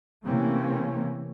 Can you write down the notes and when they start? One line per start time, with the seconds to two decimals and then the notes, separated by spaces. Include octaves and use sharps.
0.23 C3 E3 A3 A#3 C4 C#4